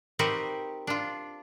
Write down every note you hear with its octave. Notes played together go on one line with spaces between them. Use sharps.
C4 D#4 F#4 G4 A#4 B4
D4 F4